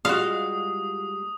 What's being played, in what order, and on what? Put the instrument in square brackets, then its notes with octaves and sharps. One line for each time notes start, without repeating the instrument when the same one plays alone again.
[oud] G3 G#3 [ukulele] F4 F#4 [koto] F5 [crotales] D#6